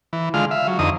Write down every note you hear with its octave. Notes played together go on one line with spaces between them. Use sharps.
E3
D3 G#3 F4 F6
E5 F5
F#3
F2 D3 D#4 D#6